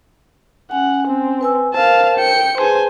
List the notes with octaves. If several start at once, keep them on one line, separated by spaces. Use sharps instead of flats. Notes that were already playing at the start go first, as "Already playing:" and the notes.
C#4 F#5 G#5
C4
B4 G#5 E6
A#4 C5 F5 A5
G5 C#7
G#4 B4 C5 G#5 A5